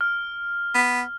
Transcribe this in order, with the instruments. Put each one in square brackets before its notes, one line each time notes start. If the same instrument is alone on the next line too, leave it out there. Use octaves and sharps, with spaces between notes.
[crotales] F6
[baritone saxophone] B3